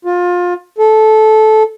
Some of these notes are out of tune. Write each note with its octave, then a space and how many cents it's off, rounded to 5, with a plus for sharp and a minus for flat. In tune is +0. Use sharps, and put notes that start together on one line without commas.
F4 +25
A4 -15